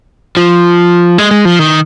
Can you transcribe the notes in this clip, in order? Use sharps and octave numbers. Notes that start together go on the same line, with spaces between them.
F3
G#3
G#3
F3
D#3